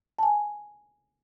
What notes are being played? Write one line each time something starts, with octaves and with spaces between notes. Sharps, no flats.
G#5 A5